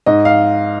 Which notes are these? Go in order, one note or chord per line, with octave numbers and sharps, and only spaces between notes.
G#2 D#5
F5